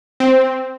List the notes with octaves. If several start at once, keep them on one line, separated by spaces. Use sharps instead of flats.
C4